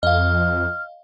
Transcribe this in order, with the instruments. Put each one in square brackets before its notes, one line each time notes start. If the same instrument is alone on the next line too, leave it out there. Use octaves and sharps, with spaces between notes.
[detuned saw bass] F2 [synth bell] D#5 F5 [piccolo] F6